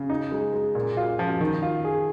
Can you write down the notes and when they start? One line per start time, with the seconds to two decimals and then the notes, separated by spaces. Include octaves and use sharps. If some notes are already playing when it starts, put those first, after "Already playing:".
Already playing: C#3
0.10 D#4
0.32 G#3
0.53 G#3
0.75 A#2
0.97 F4
1.19 F3
1.41 D#3
1.62 F4
1.84 G#4